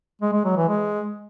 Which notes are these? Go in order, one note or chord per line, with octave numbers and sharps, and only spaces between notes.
G#3
G#3
F#3
E3
G#3